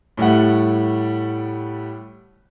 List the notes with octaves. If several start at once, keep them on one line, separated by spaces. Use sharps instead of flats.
A2 G3 A3 F#5